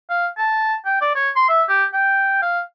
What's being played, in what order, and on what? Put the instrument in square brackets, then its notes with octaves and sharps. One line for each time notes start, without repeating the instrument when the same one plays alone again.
[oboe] F5
A5
G5
D5
C#5
C6
E5
G4
G5
F5